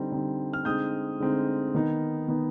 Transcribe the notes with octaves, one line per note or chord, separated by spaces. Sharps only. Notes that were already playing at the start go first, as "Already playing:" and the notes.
Already playing: D3 G3 C4 D#4
D3 G3 C4 D#4
F6
D3 G#3 C4 D#4 D#6 G6
D3 G#3 C4 D#4
D#3 B3 D#4
D#3 B3 D#4